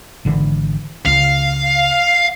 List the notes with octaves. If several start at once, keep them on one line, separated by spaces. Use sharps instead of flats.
G#1 D3 E3
C#2 F5